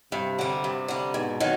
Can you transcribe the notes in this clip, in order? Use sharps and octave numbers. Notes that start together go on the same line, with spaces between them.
G2 C3
D3 G3
G2
D3 G3
G#2 B2
D#3 F#3